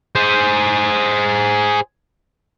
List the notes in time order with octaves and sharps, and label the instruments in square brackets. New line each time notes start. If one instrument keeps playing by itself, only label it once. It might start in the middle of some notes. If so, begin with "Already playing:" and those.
[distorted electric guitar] G#4 C5